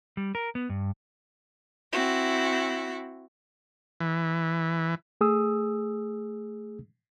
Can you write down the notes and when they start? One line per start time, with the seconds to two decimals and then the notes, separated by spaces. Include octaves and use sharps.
0.17 G3
0.35 A#4
0.55 B3
0.69 G2
1.92 C4 E4 F#4
4.00 E3
5.21 A3 G#4 D#6 E6